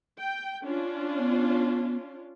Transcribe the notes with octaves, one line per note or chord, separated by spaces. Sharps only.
G5
C#4 D4 F4
B3